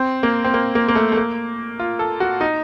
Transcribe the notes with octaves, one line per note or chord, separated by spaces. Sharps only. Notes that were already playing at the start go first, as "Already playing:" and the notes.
Already playing: C4
A#3
C4
A#3
A#3
A#3
A3
A3
A#3
F4
A4
F#4
D#4